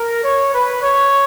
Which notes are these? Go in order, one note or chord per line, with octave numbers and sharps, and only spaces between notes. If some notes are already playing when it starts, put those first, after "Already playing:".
Already playing: A#4
C#5
B4
C#5